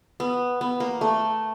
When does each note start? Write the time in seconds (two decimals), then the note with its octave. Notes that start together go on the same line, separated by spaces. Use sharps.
0.20 B3
0.61 B3
0.80 A#3
1.01 A3